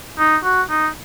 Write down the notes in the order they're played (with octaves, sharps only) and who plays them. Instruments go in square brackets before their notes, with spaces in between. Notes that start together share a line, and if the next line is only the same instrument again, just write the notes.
[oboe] D#4
F#4
D#4